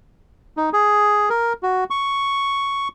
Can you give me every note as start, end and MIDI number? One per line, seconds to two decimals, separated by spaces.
0.57 0.70 63
0.73 1.29 68
1.30 1.53 70
1.63 1.84 66
1.90 2.88 85